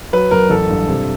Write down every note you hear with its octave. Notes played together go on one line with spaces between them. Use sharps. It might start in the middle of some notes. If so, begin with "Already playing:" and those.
F#3 B4
F#2 A#4
A1 A4
G2
C3